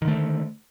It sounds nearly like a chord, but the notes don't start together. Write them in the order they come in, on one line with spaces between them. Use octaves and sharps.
D#3 D3 A3